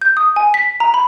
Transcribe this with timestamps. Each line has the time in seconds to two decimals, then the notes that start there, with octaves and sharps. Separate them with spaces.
0.01 G6
0.17 D#6
0.36 G#5
0.54 B6
0.80 A#5
0.94 B5